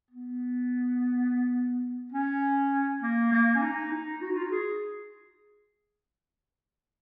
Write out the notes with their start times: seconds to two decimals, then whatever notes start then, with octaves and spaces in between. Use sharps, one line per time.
0.11 B3
2.12 C#4
3.02 A#3
3.32 A#3
3.55 C#4
3.62 D#4
3.92 D#4
4.22 F#4
4.30 D#4
4.37 F4
4.44 F#4
4.51 G#4